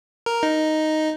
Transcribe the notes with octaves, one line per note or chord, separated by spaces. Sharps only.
A#4
D#4